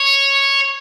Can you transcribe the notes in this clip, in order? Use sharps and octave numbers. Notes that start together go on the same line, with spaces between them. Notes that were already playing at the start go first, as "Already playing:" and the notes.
Already playing: C#5